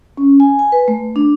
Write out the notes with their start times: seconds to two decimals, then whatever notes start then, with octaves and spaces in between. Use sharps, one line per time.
0.17 C#4
0.40 G#5
0.59 G#5
0.72 B4
0.88 A3
1.16 D4